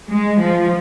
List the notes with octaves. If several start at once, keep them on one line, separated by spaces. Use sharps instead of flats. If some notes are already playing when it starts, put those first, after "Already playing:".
G#3
F3